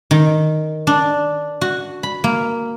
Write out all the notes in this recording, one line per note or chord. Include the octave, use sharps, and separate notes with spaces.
D#3
D4
F#4
B5
A#3